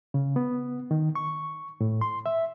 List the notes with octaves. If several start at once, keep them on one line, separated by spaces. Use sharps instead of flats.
C#3
B3
D#3
C#6
A2
C6
E5